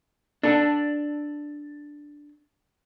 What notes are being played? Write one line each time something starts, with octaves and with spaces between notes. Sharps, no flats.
D4 A4